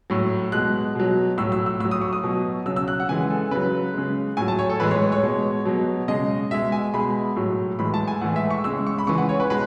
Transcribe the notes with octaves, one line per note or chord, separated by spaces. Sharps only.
A2 F#3
B2 G#3 F#6
B2 F#3
A2 F#3 E6
E6
E6
A2 E6
F#3
D#6
C#6
D#6
B2 F#3
C#3 F#3 E6
E6
F#6
F#5
C#3 E3 G#3 G#5
A4
C#3 F#3 B4
C#3 G#3
A2 F#3 G#5
A5
C#5
A4
A2 E3 G#3 B4
C#5
C#5
C#5
B2 G#3
B2 F#3
C#3 G#3 D#5
B2 G#3 E5
G#5
B2 G#3 B5
A2 F#3
A2 E3 G#3 B5
A5
G#5
A2 E3 G#3 F#5
E5
C#6
C#3 G#3 E6
C#6
B5
C#3 E3 G#3 C#6
F#5
C#5
B4
B2 G#3 B4